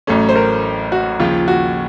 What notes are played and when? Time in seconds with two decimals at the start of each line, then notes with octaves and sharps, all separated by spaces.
0.07 A1 A2 F#3 A3 C#4
0.29 C5
0.36 A#4
0.92 F#4
1.20 D#2 C#3 F3 F4
1.48 F#4